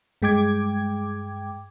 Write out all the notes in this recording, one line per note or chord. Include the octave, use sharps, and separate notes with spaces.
G2 G#3 G5 D6 G#6